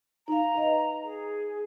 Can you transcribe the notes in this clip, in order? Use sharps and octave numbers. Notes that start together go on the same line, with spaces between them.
D#4 F5 A#5
B4 D#5
G#4